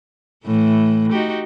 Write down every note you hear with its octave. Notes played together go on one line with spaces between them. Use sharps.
A2 E3 A3
D#4 F#4 G4